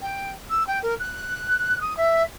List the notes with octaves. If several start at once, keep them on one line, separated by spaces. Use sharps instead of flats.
G5
E6
G5
A#4
F#6
D#6
E5